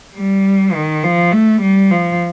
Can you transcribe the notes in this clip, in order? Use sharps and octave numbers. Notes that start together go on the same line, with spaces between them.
G3
D#3
F3
A3
G3
F3